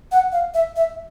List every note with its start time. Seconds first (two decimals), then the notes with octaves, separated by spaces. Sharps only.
0.12 F#5
0.32 F5
0.54 E5
0.76 E5